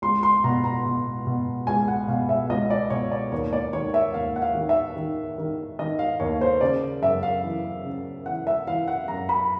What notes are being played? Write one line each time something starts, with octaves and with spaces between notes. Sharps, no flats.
C#2 C6
C6
B2 A#5
A#5
B2
B2
C#2 G#5
F#5
B2 F5
E5
C#2 D#5
D5
B2 C#5
D5
D#2 C#5
D5
D#3 C#5
E5
D#2 F5
F#5
F5
D#3
E5
D#3
D#3
D#3 D#5
F5
D#2 C#5
C5
C#3 D5
F#2 E5
F5
E3
C#3
E3 F#5
E5
E3 F5
F#5
F#2 A#5
B5